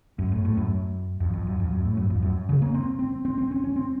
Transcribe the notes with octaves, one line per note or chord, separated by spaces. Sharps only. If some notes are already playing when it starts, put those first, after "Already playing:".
F#2
A2
A2
F#2
F2
F2
F#2
F2
F#2
A2
F#2
F2
F#2
C#3
A#3
C4
C4
C4
C4
C#4
C#4
C4